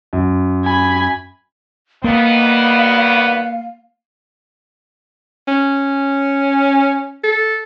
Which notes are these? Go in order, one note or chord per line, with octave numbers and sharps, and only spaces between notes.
F#2
G#5 B5
D#3 G3 A#3 B3 F5
C#4
A4